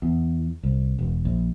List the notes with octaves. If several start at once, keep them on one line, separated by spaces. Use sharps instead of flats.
E2
C2
E1
A#1